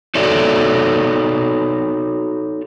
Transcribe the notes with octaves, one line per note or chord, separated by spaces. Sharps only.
D#4 F#4 A4 C#5 D5 E5